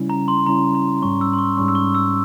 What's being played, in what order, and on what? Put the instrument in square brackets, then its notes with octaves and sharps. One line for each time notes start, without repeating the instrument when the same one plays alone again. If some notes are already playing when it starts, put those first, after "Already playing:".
Already playing: [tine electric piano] C#3 G3 C#4 E4
[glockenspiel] A#5
C6
[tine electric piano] C#3 G3 C#4 E4 [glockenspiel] A#5
[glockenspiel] A#5
[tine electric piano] G#2 G3 C#4 [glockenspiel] C#6
[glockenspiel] E6
C6
C#6
[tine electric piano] G#2 G3 C#4 [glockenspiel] C#6
[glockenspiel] E6
C#6
E6